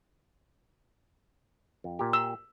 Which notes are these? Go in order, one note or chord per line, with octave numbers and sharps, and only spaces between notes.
F2
A#2 G4
E6